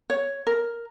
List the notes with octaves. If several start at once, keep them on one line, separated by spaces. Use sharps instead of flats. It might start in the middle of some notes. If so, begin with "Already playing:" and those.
C#5
A#4